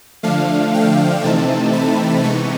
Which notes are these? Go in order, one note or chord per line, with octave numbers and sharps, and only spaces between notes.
D3 F3 A3 D4 F5
G5
C3 E3 A3 C4 D#4 A5
B5
C3 E3 G#3 B3 D#4 C#6